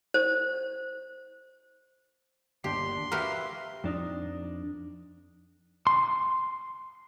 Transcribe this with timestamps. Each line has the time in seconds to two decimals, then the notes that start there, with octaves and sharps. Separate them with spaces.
0.14 C5
2.64 G1 D#2 D4 G4 C6
3.12 F#4 G4 A#4 B4 E5 F5
3.84 F2 D4 D#4
5.87 C6